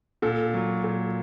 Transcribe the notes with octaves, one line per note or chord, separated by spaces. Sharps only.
A#2 A4
F#3
A#2